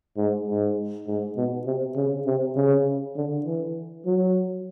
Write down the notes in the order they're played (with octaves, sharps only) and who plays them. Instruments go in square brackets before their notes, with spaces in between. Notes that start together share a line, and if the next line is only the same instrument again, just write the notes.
[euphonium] G#2
G#2
G#2
B2
C3
C#3
C3
C#3
D3
E3
F#3